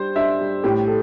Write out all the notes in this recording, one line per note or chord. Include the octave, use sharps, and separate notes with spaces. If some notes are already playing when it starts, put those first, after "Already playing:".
Already playing: G3 D4 C5
D4 E5
G3
A2 G4
A4